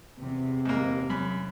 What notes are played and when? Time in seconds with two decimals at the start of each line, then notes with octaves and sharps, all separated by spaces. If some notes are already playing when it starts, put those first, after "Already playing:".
0.19 E2 C3
0.66 G#2 A#3
1.10 F#2 B5